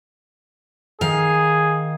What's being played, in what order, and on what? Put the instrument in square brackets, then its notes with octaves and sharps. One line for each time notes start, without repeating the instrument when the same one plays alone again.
[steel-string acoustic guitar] D#3 F5 [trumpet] G#4